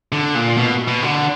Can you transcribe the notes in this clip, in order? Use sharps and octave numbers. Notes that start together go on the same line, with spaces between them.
D3
A#2
B2
B2
D3